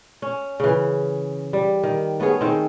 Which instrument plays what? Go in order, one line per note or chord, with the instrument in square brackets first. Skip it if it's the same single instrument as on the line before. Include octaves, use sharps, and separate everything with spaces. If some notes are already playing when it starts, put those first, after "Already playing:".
[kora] C#4
C#3 E3
G3
D#3
A3 B3 C#4 G#4
D#3 C4